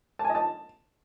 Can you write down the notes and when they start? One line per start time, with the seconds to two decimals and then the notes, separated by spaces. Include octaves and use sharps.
0.19 A5
0.25 G#5
0.30 D#5
0.35 A5